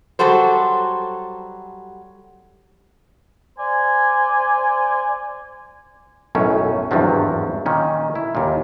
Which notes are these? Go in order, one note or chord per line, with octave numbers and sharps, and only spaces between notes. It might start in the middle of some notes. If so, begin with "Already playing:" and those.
F#3 G3 F#4 A4 C5
C5 D5 G#5
B1 F#2 A2 C#4
G#1 E2 G2 F3 F#3
A#2 D#3 C#4
E4
D#2 A#2